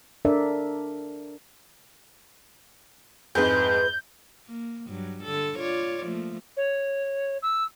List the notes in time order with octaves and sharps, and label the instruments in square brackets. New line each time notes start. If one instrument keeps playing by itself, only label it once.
[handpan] D4 A4 A#4 D5 E5
[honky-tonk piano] F2 G#2 [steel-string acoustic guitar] G#3 E4 B4 [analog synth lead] G6
[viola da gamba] A#3
G2 F#3
D3 A4
F4 C#5 D5
F3 A3 A#3
[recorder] C#5
E6